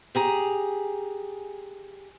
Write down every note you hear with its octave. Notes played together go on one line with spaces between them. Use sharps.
G4 G#4 A#5